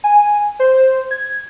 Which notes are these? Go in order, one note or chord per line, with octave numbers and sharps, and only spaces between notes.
G#5
C5
G#6